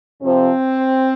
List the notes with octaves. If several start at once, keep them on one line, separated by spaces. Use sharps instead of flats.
F2 C3 F3 C4